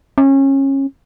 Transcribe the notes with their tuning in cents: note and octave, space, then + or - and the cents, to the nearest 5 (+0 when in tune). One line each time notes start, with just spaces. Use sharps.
C#4 -25